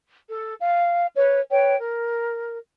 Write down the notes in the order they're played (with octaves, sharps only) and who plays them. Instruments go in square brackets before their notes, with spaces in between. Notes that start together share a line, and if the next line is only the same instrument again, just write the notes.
[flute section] A4
F5
B4 C#5
B4 C#5 G5
A#4